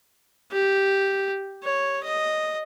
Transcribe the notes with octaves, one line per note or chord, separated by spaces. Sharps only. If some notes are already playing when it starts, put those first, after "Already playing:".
G4
C#5
D#5